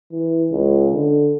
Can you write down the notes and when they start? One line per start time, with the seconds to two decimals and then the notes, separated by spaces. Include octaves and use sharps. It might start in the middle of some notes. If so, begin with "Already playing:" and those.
0.12 E3
0.51 C#2
0.93 D3